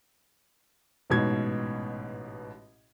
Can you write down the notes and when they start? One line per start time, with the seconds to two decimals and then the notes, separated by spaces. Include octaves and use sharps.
1.10 A1 G#2 B2 G#6